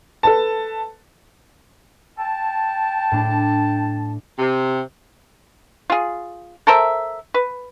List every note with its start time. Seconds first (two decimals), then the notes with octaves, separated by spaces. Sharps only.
0.23 A4 B4 A5
2.18 G5 A5
3.12 A2 D4
4.39 C3
5.90 F4 G#4
6.67 A4 A#4 C5 E5
7.34 B4